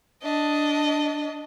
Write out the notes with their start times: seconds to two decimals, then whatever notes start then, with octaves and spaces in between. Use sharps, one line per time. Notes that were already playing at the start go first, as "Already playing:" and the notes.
0.23 D4 D#5